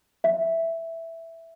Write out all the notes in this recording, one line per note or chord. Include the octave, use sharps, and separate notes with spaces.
E5